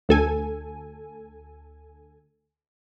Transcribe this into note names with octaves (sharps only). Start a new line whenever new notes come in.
D2 A4 G#5